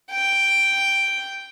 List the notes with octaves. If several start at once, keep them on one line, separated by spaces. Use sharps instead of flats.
G5